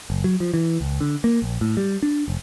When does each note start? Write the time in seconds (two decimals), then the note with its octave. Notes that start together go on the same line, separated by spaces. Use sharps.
0.10 F#1
0.24 F#3
0.40 F3
0.54 E3
0.81 C#2
1.01 D3
1.24 A#3
1.42 A#1
1.61 A2
1.77 G3
2.03 D4
2.28 F1